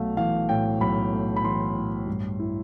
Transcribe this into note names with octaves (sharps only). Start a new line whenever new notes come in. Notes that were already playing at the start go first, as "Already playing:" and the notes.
Already playing: B1 A3 F5
E3 F5
A2 G5
B1 B5
A3
B5
E3 C6
A2
G2
E4